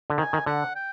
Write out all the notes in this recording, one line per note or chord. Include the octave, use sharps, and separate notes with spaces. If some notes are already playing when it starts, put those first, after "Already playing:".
D3
D#3 G#5
D#3
D3 F#5
G5